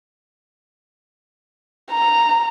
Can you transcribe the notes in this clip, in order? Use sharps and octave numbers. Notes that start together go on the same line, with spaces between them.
A#5